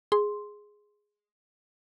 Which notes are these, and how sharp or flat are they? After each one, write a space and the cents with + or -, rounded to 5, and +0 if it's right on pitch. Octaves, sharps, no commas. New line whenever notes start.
G#4 +0 C6 +0